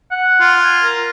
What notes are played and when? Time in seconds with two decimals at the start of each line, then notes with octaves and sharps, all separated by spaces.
0.11 F#5
0.40 F4
0.64 G#5
0.83 A#4